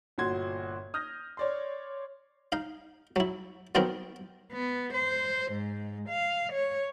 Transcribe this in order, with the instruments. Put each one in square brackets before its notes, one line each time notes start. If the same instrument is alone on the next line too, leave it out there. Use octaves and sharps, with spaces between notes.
[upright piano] G1 A#2 F#4 C6 G#6
D#6 F6 G6 A#6
C#5 D5 C6
[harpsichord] D#4 F5
F#3 E4
D#3 F#3 B3 C4 E4 A#4
[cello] B3
C5
G#2
F5
C#5